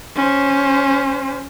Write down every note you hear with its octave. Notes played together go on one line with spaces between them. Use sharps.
C#4 C5